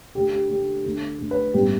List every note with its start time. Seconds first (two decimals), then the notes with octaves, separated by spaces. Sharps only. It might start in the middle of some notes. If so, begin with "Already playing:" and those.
0.15 D2 D3 A3 G4
0.33 G4
0.50 D2 D3 A3 G4
0.84 D2 D3 A3
1.19 D2 D3 A3
1.31 B4
1.53 A1 G2 G3 B3 G4